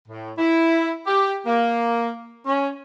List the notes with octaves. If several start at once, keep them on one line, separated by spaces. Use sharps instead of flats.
A2
E4
G4
A#3
C#4